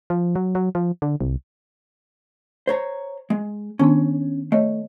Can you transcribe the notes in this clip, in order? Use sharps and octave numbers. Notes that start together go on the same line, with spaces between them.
F3
F#3
F#3
F3
D3
C2
C5 C#5 A#5
G#3
D#3 B3 C#4 D4
A3 C#5 D#5